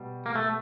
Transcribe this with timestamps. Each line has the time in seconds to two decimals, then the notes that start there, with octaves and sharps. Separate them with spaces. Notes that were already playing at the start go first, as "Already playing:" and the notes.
Already playing: B2 G3
0.26 A#3
0.35 A3